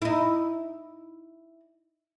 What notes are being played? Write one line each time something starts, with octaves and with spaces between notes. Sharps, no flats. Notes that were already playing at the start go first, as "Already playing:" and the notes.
D#4 E4